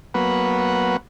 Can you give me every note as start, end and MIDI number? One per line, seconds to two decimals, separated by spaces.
0.14 0.97 54
0.14 0.97 58
0.14 0.97 59
0.14 0.97 71
0.14 0.97 78